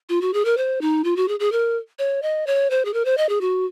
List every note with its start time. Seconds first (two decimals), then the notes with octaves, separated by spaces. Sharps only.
0.09 F4
0.21 F#4
0.33 G#4
0.45 A#4
0.57 C5
0.81 D#4
1.04 F4
1.16 F#4
1.28 G#4
1.40 G#4
1.52 A#4
1.99 C#5
2.22 D#5
2.47 C#5
2.70 C5
2.85 G#4
2.94 A#4
3.05 C5
3.18 D#5
3.29 G#4
3.41 F#4